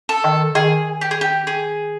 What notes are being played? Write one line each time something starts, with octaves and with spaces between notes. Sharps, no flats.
A4
D#3
D#3 G#4
G4
G#4
G4
G#4